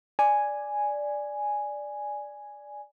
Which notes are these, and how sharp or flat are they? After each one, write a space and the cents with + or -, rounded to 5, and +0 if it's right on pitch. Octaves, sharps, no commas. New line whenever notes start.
D5 +0 G#5 +0